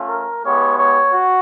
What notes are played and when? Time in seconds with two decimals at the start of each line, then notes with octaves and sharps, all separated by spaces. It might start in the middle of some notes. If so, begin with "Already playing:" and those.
Already playing: A3 C#4 F4
0.08 A#4
0.43 G#3 B3 E4 G4 C#5
0.77 C#5
1.12 F#4